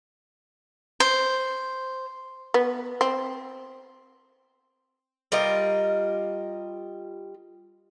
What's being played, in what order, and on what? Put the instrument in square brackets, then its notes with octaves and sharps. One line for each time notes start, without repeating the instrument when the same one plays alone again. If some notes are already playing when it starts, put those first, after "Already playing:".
[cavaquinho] C5
[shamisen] B3
C4
[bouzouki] G3 F4 A#4 D#5